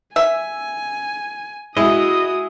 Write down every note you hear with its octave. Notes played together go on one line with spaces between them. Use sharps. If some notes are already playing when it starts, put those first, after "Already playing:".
E5 G#5
G#3 E4 F#4 D#5 D#6